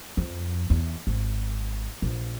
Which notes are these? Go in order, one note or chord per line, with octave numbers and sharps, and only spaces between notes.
F2
E2
G#1
A#1